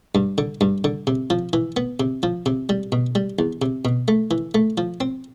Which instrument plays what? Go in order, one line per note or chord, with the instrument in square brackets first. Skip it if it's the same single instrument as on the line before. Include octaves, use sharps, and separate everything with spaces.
[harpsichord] G2
D3
G2
D3
C3
F3
E3
B3
C3
F3
C3
G3
B2
G3
E2
C3
B2
A3
E3
A3
F3
C4